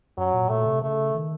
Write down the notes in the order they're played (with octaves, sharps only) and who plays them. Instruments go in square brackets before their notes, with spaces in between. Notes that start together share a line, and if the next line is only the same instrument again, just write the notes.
[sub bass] F#2 [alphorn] F#3
[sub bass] A#2
[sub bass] A#2 [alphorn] A3
[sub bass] C3
[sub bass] C#3 [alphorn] A3
[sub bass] D#3